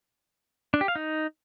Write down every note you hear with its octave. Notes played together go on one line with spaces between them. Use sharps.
D4
G4
F5
D#4